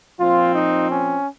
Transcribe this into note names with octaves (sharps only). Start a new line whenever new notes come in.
A#2 F3 C4 F4
D#4
C#4